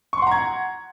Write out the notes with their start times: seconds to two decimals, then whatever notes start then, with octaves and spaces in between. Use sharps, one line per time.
0.13 C#6
0.18 C6
0.22 F#5
0.27 A#5
0.31 G#6